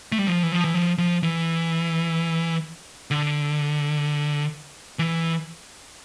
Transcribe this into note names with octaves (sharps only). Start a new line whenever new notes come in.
A3
G3
F3
E3
F3
E3
F3
F3
E3
D3
E3